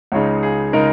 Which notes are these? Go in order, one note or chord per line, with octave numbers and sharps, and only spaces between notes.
C#2 C#3 G#3 D#4 C#5
G#4
C#3 G#3 D#4 A#4